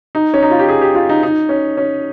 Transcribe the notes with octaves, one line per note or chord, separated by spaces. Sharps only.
D#4
C#4
D#4
F4
G4
G#4
G4
F4
D#4
D#4
C#4
C#4